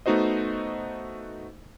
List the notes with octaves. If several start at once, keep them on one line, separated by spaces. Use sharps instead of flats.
A3 B3 D#4 F#4 C5 D#5